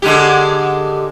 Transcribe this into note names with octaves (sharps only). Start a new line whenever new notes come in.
D3 G#3 G4